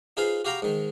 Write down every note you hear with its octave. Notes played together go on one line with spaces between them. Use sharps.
D#4 F4 G#4 B4 C5 F5
F#4 G4 F5 G5 A#5 B5
G#2 D#3